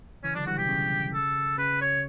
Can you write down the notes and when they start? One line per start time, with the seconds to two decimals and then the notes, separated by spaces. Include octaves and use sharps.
0.23 C#3 E3 C#4
0.35 D3 F#3 D4
0.46 E3 G3 F#4
0.57 B2 G4
0.69 C#3
1.14 A4
1.58 C#3 B4
1.81 C#5